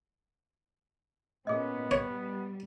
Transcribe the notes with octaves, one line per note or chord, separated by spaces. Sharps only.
A#2 B3 C#4 G#4 D#5
G3 C#5